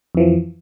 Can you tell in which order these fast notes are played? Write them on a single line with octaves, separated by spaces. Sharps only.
F2 E3 F3